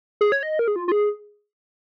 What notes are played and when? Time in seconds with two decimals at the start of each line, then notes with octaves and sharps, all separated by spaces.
0.21 G#4
0.32 C#5
0.43 D#5
0.59 A#4
0.68 G#4
0.76 F4
0.88 F4
0.92 G#4